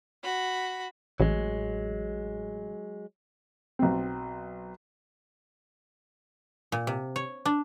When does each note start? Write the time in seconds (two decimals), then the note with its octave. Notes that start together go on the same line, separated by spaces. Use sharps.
0.23 F#4 B5
1.20 A1 F#3 G#3
3.79 B1 C4
6.72 A#2
6.87 C3
7.16 C#5
7.45 D4